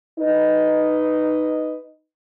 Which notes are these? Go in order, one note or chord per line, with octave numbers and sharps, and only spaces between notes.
D#4 B4 D#5